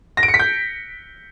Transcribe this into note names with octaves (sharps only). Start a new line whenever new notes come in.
A#6
D7
C#7
B6
G6